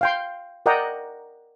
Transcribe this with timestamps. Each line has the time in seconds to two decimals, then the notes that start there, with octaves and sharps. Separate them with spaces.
0.01 F5 G5 C6
0.66 A#4 D5 D#5 F#5 G5 A#5